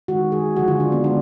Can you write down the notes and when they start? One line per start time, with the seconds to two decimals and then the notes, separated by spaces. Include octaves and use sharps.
0.08 D#3 G#3 F#4
0.32 G#4
0.56 D3 F3 G#3 F#4
0.68 F4
0.80 D4
0.92 B3
1.04 D3 G#3 D4